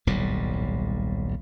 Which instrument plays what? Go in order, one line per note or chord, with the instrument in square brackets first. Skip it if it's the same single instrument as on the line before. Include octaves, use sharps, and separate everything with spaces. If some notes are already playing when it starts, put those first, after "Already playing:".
[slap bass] D#1 B1 A2 G3